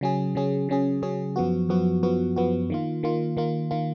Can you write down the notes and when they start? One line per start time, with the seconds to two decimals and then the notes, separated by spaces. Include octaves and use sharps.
0.01 C#3 F#3 C#4 G#4
0.35 C#3 F#3 C#4 G#4
0.69 C#3 F#3 C#4 G#4
1.02 C#3 F#3 C#4 G#4
1.36 F#2 F3 B3 F#4
1.69 F#2 F3 B3 F#4
2.03 F#2 F3 B3 F#4
2.36 F#2 F3 B3 F#4
2.70 D#3 A#3 F4
3.03 D#3 A#3 F4
3.37 D#3 A#3 F4
3.71 D#3 A#3 F4